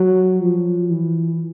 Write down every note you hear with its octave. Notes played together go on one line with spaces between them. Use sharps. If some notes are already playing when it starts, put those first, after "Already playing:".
Already playing: F#3
F3
E3